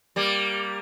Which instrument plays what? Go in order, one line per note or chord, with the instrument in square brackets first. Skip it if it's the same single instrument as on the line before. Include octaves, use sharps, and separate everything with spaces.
[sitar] G3 A#3